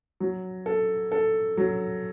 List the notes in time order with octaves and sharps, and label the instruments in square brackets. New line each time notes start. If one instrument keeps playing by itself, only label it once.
[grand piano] F#3
A4
A4
F#3